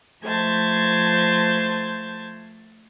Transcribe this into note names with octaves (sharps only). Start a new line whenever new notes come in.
F3 A3 C5 A5 G#6